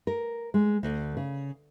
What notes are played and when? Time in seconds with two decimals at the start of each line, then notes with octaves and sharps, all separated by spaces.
0.07 A#4
0.54 G#3
0.83 D2
1.17 C#3